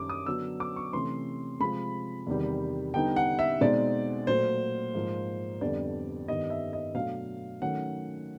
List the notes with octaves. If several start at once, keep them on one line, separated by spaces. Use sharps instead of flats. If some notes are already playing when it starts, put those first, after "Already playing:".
Already playing: F#2 D#3 G3 D6
D#6
D3 F#3 B3 D4 E6
D6
C#6
C3 E3 A3 C#4 C6
C3 F3 G#3 B5
E2 C3 D#3 G3
D3 G3 B3 D#4 G5
F#5
E5
B2 G#3 C4 D#4 D5
A#2 F#3 A3 C5
G#2 F3 A#3
F2 D3 G3 B3 D4 D5
G2 D#3 G3 B3 D#5
E5
D#5
B2 F#3 A3 D4 F5
D#3 F#3 A3 C#4 F#5